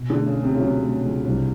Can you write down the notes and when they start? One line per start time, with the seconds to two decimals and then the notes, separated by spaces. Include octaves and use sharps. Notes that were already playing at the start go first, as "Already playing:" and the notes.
Already playing: B2
0.10 D3
0.15 A3
0.26 C#3
0.37 C#2
0.43 C3
0.54 C#3
0.59 F#3
0.66 C3
0.81 A3
1.03 C#2
1.25 C2